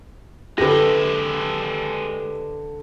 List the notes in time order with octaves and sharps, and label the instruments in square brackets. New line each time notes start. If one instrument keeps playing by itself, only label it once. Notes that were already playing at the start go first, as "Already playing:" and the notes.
[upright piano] D3 A#6 [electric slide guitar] G#3 A4 [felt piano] G4 B4